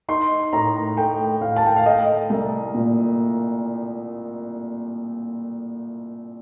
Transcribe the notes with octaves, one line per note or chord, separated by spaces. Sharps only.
D#4 C6
A2 A#5
A3 G5
A2 F5
A5
G5
F5
A3 D#5
C2
A#2